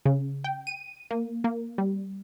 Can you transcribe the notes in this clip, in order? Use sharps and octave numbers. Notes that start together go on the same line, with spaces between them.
C#3
G5
D#7
A#3
A#3
G3